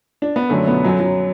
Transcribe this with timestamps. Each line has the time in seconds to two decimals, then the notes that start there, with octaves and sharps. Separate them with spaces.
0.22 D4
0.36 B3
0.49 F#2 D3 F#3 A3
0.67 B2 B3
0.84 F#2 F#3
1.00 F#3